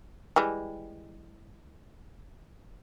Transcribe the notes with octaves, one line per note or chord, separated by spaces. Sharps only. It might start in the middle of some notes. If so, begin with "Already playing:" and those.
E3 G3 G#3